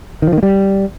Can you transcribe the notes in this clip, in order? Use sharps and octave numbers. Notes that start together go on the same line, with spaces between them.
D#3
F3
D#3
A#3
G3